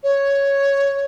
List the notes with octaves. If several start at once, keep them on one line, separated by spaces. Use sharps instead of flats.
C#5